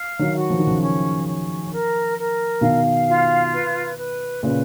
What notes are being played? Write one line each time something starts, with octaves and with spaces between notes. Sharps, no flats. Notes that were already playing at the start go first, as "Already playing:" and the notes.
Already playing: F5
D#3 F#3
F#4
F3
D#3
C#3 F3
C#4
C#4
A#4
A#4
B2 D#3 F5
F4
B4
B4
A#2 C#3 B4